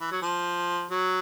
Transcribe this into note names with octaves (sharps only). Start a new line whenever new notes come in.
E3
F#3
F3
F#3